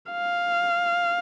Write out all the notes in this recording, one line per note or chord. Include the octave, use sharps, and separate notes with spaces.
F5